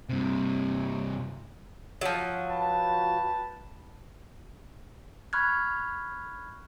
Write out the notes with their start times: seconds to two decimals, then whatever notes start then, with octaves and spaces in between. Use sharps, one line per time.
0.09 G2 C3
2.01 F3 F#3
2.48 B4 G5 A5
5.33 B5 C#6 F6 F#6 G#6